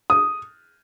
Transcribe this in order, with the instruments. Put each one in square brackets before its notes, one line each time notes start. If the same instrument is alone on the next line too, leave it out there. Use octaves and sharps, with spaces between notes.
[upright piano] D#6